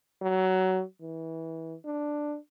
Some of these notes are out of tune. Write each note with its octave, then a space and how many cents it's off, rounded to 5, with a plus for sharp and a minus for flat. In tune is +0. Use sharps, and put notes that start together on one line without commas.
F#3 +20
E3 -20
D4 +5